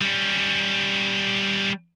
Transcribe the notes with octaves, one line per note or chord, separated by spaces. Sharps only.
G3 C#4